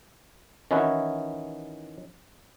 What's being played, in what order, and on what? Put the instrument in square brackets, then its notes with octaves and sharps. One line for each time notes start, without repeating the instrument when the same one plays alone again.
[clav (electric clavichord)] D#3 E3 C#4 D#4 E4 F#4